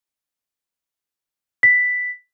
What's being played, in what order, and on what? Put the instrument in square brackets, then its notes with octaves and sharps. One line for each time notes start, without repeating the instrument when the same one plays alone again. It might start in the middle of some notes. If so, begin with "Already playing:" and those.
[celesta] B6